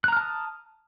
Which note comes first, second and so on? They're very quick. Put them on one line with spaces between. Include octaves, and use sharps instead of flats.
F#6 A#5 F6 A5 D#6